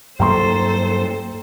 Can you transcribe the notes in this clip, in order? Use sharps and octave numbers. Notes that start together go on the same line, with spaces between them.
G2 F#3 A#3 A4 C5 G5 A#5 C6